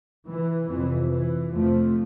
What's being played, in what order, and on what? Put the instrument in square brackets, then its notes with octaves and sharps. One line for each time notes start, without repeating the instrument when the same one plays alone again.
[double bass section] E3
F2 C3 E3
E3
F2 C3 F3 A3